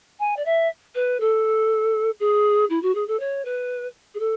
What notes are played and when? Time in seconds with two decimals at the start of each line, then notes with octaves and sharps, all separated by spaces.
0.20 G#5
0.37 D5
0.45 E5
0.95 B4
1.20 A4
2.20 G#4
2.70 E4
2.83 F#4
2.95 G#4
3.08 A4
3.20 C#5
3.45 B4
4.15 G#4
4.20 A4